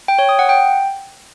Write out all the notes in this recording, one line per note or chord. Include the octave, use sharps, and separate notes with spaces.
G5
C#5
D#6
F#5
G5